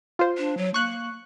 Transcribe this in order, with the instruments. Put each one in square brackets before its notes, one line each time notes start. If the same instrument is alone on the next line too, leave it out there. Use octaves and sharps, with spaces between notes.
[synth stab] F4 C5
[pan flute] D4
F#3
[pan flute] A#3 [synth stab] C#6 F#6